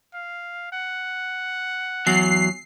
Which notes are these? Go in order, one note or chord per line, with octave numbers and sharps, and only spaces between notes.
F5
F#5
E2 F#3 C7